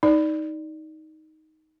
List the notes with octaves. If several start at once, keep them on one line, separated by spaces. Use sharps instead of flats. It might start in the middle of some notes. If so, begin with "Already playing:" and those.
D#4 D5